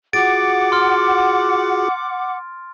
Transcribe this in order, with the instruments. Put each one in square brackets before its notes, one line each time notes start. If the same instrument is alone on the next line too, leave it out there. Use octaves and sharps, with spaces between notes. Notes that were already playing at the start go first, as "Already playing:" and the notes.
[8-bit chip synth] F4 F#4 G#4 [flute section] F#5 D6 [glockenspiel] A6 D7
[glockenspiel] C6 F6